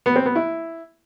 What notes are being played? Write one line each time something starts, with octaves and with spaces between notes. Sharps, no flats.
B3
C4
B3
E4